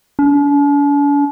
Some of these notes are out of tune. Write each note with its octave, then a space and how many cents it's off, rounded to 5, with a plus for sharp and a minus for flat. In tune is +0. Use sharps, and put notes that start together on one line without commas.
D4 -45